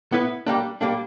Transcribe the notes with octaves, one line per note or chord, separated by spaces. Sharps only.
B3 E4 B4
G3 A#3 D4
G3 A#3 D4